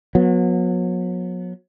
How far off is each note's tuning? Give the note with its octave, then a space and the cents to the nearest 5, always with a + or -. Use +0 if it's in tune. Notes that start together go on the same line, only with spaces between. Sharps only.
F#3 -35 B3 -20